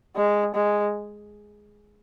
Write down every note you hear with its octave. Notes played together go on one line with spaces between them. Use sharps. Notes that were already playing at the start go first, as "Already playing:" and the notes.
G#3
G#3